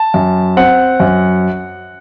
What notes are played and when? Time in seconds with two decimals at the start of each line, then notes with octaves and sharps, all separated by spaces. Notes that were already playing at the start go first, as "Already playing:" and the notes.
Already playing: A5
0.14 F#2
0.57 C4 F#5
1.00 F#2